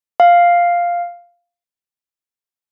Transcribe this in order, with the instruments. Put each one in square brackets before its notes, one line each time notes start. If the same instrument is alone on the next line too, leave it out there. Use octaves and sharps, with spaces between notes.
[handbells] F5